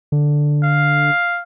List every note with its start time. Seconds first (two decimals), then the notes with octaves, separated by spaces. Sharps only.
0.12 D3
0.63 F5